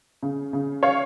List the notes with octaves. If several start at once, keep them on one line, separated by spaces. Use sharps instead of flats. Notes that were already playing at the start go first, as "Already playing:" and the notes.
C#3
C#3
C#5 F5